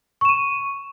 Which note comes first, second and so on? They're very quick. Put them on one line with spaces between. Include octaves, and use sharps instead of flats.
C#6 E7 D#7